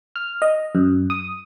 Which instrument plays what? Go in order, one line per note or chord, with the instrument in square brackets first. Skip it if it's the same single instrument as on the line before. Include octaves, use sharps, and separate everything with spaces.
[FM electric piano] F6
D#5
F#2
D#6